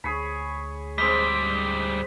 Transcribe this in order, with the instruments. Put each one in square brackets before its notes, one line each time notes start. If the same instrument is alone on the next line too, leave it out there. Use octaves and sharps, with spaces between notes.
[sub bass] D2 [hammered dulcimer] G#4 C#5 B5
[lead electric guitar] G#2 G3 [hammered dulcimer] G#3 C4 [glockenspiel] B6